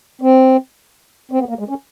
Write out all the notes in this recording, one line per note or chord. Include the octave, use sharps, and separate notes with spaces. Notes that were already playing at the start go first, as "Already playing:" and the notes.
C4
C4
B3
A#3
G#3
C#4